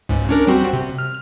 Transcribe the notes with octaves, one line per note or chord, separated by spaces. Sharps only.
C#2 G#2
C#4 D4 A#4
G3 C4 F#4
C3
F6